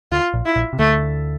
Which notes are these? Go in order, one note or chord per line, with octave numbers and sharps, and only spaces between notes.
D2 D3 F4
A#1 A#2
E4
A#1 A#2
C3
D2 D3 A3